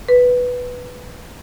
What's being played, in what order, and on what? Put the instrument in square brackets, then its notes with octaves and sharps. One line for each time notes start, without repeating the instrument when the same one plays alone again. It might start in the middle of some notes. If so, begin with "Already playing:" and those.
[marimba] B4